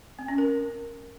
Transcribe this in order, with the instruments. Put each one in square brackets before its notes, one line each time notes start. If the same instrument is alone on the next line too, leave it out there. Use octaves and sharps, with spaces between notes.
[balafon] C4
C#4
A#4